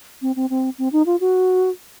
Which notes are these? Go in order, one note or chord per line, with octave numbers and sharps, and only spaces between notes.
C4
C4
C4
C4
D#4
F4
F#4